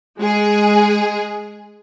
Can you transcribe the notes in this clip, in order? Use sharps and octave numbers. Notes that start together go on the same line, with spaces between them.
G#3 G#4